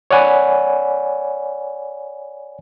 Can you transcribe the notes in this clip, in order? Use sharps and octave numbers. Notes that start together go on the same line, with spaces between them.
C#5 D5 F#5 G#5 B5